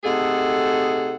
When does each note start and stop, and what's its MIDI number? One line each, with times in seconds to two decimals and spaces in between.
0.04 1.16 48
0.04 1.16 57
0.04 1.16 63
0.04 1.16 68
0.04 1.16 69
0.04 1.16 78